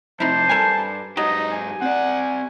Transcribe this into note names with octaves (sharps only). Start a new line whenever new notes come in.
F2 C3 D#4 E4 C5 A5
G2 A4 A#4 G#5
G#2 F#3 D#4 G4 D#5
G#5
C4 D5 F#5